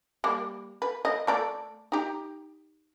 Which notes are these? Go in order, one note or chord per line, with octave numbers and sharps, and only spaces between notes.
G3 A#3
B4
D#5
A3 A4 D5
D#4 G4